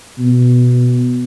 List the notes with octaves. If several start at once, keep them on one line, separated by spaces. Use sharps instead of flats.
B2